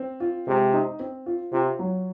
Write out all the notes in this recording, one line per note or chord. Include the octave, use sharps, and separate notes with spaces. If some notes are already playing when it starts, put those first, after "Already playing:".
Already playing: C4
F4
C3 G#3
D#4
C4
F4
C3 F4
F#3